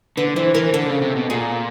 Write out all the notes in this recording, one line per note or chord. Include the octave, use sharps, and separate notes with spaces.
D3 B4
E3 C5
E3 A#4
D3 A4
C#3
C3
B2
A#2 G#4